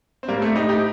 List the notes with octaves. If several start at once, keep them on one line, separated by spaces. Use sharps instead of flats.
C4
A2 G3 A#3
A3 C4
A2 D#4 G4
D#4 G4